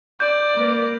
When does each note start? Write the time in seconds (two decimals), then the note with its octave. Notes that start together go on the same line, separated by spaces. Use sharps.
0.20 D5 G6
0.55 A#3 B4